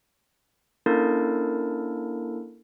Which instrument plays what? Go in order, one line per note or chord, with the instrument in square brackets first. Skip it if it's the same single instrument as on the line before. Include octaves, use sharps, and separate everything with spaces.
[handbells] A#3 C#4 D4 E4 A4 A#4